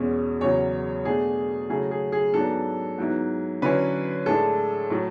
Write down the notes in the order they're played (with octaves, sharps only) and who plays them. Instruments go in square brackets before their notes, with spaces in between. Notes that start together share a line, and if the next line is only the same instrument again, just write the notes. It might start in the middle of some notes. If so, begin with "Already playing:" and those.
Already playing: [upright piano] E2 B2 G#3 C#4
E2 C#3 F#3 C#5
B2 A3 D4 G#4
C#3 F#3 A3 E4 G#4
G#4
G#4
G#2 F#3 B3 D4 A4
G#2 F#3 B3 E4
D3 F#3 C#4 E4 B4
A2 G#3 D4 A4
A2 F#3 A3